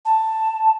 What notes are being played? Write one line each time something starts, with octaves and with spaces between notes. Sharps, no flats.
A5